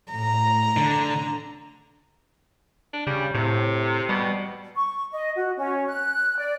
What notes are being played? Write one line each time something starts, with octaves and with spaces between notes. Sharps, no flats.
A2 A#5
D3
D4
C#3 G3
A2 C3
B2 G3
C#6
D#5
F#4
C#4
F#6
D5